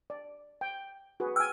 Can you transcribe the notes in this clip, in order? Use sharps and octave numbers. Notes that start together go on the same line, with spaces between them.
D5
G5
F#4 G#4 B4
G5 G#5 E6 F6